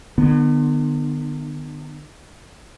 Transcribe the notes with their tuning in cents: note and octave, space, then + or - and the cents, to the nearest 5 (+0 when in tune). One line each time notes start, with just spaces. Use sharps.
D3 +40 B3 +0